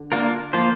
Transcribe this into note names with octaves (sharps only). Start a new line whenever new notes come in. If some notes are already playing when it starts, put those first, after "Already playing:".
Already playing: D3
A#3 D4 F4 A#4
F3 A#3 F4 C5